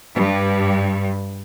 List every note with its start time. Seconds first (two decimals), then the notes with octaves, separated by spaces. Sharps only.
0.14 G2